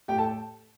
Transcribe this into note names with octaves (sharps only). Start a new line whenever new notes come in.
A2 G4 G5
A4 A5